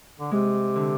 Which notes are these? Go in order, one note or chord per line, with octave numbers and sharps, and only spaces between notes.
D3
C3 G#3
D3